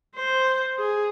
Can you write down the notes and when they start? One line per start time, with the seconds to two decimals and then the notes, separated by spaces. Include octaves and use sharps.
0.15 C5
0.78 G#4